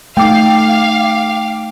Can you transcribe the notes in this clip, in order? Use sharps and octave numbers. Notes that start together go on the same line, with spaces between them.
A3 D#4 F5 G5 D6